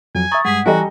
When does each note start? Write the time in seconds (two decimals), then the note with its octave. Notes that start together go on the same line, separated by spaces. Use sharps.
0.15 F2 F#3 G#5
0.32 E5 A#5 C#6 D#6 A6
0.45 G2 G3 G#3 G#4 F#5 B6
0.66 E3 G3 F#4 A4 D#5 G#5 A#5